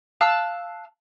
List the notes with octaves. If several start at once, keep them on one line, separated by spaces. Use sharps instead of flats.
F5 A5 E6 F#6